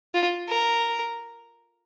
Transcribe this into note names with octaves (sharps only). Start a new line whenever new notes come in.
F4
A#4